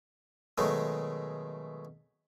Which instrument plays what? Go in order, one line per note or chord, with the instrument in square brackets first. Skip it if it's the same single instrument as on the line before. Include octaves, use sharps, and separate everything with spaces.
[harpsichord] B2 D#3 F#3 G#3 A3